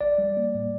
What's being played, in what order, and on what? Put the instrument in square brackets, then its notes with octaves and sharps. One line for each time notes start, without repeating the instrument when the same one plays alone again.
[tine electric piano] A1 D5
G3
A#3
A2